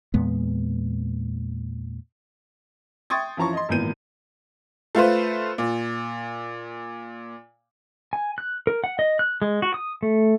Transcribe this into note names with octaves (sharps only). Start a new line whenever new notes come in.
E2 A#2 G#3 B3
G5 C6 C#6 D#6 G#6 A6
E3 F3 C#4 A5 A#5 C#6
D#5 C6
G#1 A#2 E3 B3 G6 D#7
A3 F4 B4 C5
A#2
G#5
F#6
A#4
F#5
D#5
F#6
G#3
F#4
D#6
A3